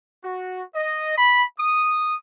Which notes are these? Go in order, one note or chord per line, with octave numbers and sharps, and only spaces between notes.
F#4
D#5
B5
D#6